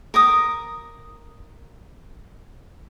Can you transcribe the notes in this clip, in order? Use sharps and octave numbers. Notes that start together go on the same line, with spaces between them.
A#4 D6 D#6